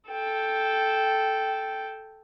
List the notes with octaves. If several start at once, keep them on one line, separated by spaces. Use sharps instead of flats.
A4 G5